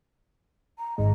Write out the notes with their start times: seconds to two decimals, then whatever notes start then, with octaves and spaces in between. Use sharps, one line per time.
0.79 A#5
0.98 G#1 G#2 G#3 D#5